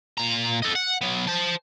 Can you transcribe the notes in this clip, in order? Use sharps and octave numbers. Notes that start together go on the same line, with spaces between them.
A#2 A#5
A4 D#5
F#5
F#3 B3
C5 A5